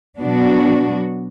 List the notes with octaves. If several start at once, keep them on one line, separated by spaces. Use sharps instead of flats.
B2 F#3 B3 D4 F#4